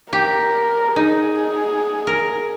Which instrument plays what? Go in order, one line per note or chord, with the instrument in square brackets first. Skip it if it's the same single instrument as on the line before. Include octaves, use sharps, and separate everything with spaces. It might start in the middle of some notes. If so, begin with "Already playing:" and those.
[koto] G4 [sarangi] A#4
[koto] D#4 [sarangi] G#4
[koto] A#4